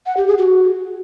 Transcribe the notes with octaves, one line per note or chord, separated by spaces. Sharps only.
F#5
G4
G#4
F#4